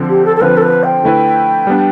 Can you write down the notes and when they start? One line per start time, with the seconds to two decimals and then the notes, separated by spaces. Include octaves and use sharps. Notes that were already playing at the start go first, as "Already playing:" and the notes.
Already playing: D3 F3 C4
0.09 G4
0.25 A4
0.36 A4
0.41 D3 F3 C4 F4 B4
0.57 A4
0.62 B4
0.83 G5
1.04 D3 A3 E4 B4
1.67 G3 B3 D4